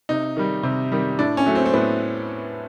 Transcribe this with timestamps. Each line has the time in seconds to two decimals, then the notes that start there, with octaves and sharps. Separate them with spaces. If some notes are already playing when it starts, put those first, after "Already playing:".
0.09 C3 D#4
0.37 D#3 G3
0.63 C3
0.92 D#3 G3
1.19 A2 D4
1.37 C#4
1.46 F#3 A3
1.55 C4
1.66 C4
1.74 A2 B3